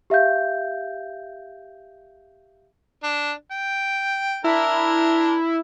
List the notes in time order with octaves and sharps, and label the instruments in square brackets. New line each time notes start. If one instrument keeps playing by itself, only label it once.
[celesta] G4 E5 F5 G6
[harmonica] D4
G5
[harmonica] D4 A#4 [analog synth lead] E4